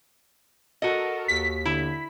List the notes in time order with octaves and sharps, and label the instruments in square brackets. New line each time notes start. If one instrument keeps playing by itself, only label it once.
[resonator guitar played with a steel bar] F#4 D#5 [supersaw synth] A4 A#4
[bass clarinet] D#2 [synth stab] B6
[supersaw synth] D3 [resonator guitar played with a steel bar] E4